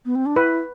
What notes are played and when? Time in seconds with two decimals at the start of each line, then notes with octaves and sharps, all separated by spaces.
0.05 B3
0.15 C4
0.26 D4
0.36 E4 B4